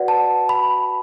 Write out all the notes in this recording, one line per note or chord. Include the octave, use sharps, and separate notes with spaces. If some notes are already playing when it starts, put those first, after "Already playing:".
Already playing: F#4 B4 D5 F#5
A5
B5